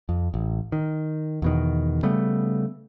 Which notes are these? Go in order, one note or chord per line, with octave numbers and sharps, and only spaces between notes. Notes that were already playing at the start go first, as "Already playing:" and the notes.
F2
A1
D#3
E2 B2 D#3
C#3 G3 A3 B3